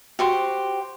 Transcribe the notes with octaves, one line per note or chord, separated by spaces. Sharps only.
F#4 G4 C5